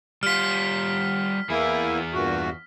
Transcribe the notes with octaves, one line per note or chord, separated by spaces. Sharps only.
G3 F4 F6 B6
E2 A#3 E4 G#4
G2 A#2 F#4